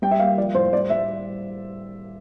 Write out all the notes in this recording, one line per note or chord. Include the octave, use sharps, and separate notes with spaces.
G3 G5
E5
A#3 F5
F3 D5
A2 C5
G3 D5
G3 E5